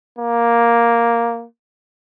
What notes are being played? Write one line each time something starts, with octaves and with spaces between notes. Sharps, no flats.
A#3